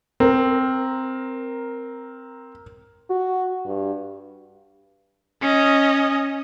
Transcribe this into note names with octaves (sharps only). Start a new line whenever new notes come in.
C4 A#4
F#4
G2
C#4 D#5